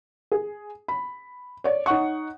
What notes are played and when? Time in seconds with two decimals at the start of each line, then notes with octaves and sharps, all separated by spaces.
0.32 G#4
0.88 B5
1.64 C#5 D5
1.86 D#4 C#5 F#5 C#6